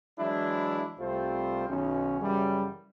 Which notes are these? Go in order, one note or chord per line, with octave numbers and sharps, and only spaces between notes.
E3 F#3 G#3 D4 E4
C2 G3 A3 C4 F4 C5
B1 D#3 C#4
F#2 C#3 E3 F#3 G3